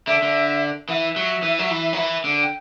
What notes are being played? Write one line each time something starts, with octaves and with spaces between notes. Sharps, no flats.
D3 E5
D3
E3 E5 F#5
F#3
E3
F#3
E3
F#3
E3
D3
G5